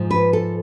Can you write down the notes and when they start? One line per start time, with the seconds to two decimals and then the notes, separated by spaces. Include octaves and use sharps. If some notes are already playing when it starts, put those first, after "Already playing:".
Already playing: G#2 F3
0.11 B4
0.33 A4